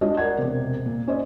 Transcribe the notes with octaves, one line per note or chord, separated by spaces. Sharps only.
G#3 D4 F4 C#5 D#5
A#4 D5 F#5 G#6
E1 C3
A#2
C#4 C5 D5 D#5